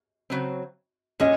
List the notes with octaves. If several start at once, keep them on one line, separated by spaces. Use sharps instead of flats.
C#3 F#3 C4
A#2 G#3 C#4 D#5